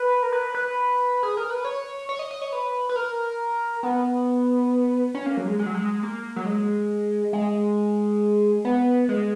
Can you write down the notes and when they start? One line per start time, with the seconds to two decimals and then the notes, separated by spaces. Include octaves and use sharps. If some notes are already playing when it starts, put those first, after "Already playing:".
Already playing: B4
0.23 A#4
0.33 B4
0.54 B4
1.23 G#4
1.37 A#4
1.50 B4
1.64 C#5
2.09 C#5
2.19 D#5
2.31 D#5
2.42 C#5
2.53 B4
2.89 B4
2.96 A#4
3.83 B3
5.15 C#4
5.26 A#3
5.37 F#3
5.48 G#3
5.59 G#3
5.66 F#3
5.75 G#3
6.03 A#3
6.36 F#3
6.46 G#3
7.33 G#3
8.65 B3
9.09 G#3